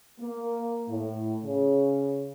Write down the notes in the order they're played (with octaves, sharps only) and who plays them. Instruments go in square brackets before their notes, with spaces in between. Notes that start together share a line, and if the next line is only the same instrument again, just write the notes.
[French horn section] A#3
A2
C#3